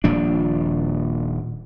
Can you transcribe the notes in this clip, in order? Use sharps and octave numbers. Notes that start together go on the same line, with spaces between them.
D#1 A#2 F3 D4